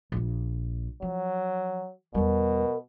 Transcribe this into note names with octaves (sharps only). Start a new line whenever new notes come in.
A#1 A#2
F3 F#3
E2 B2 G3 A#4